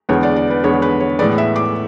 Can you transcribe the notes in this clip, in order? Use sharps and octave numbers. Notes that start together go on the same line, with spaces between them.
E2 D3 G#3 B3 C#5
D5
D5
B4
E2 D3 G#3 B3 C#5
B4
C#5
A2 E3 G#3 B3 D5
E5
D6